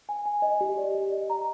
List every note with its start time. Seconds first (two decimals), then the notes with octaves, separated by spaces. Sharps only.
0.09 G#5
0.26 G#5
0.42 D#5
0.61 G4
0.78 D5
0.95 G4
1.12 D#5
1.30 A#5